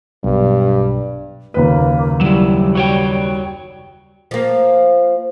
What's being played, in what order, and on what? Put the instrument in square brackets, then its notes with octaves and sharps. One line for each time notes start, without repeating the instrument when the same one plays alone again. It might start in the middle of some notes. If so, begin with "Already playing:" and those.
[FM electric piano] B1 [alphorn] G2
[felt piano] F#1 D#2 B4 [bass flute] A#3
[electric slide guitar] F#3 E4 [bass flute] G3
[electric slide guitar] F#4 C#5 G5
[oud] F3 A#3